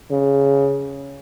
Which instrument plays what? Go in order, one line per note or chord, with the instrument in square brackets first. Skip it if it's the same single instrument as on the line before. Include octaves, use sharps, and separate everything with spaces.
[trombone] C#3